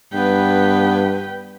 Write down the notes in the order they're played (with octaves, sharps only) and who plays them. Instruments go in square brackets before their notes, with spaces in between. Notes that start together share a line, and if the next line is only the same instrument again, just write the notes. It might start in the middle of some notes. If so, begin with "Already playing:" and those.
[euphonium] G2 [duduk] B3 [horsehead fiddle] B4 G5